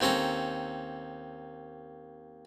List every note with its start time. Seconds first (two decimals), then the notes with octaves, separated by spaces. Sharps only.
0.01 D#2 C4 C#4 A4 A#5